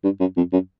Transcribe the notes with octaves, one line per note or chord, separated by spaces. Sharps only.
G2
F#2
F2
F#2